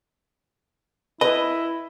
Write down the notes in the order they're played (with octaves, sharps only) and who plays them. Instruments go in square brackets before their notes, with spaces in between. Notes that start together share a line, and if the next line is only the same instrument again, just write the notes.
[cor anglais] E4 [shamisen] B4 [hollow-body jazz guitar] D#5